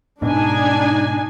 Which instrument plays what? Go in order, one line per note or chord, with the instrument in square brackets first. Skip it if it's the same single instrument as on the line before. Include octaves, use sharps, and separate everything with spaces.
[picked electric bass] G#2 B2 [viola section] D4 D#4 G#5